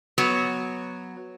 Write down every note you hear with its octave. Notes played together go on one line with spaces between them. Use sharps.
F#3 B3 C#5